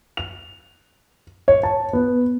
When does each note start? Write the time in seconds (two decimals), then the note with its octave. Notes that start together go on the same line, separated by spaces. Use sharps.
0.17 F7
1.48 C#5
1.63 A5
1.93 B3